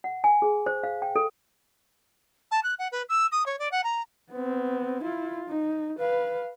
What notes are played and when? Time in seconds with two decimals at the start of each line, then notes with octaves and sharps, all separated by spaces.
0.04 F#5
0.24 G#5
0.42 G#4
0.66 C5
0.83 F5
1.02 G5
1.16 A4
2.51 A5
2.63 F#6
2.79 F#5
2.92 B4
3.09 E6
3.32 D#6
3.46 C#5
3.59 D5
3.72 F#5
3.84 A#5
4.32 B3 C4
5.03 E4 F4
5.49 D#4
5.99 B4 F5